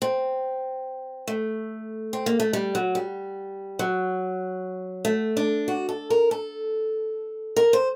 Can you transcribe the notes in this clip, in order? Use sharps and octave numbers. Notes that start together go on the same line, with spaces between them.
C4
A3
C4
A#3
A3
G3
F#3
G3
F#3
A3
D4
F#4
A4
A#4
A4
A#4
C5